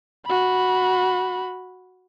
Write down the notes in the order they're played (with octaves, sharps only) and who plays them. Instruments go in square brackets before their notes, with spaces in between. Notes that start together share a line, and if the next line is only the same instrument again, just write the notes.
[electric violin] F#4 B5